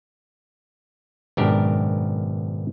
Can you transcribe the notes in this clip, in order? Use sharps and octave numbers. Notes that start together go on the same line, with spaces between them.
G#1 F#2 B2 D4 G4 A#4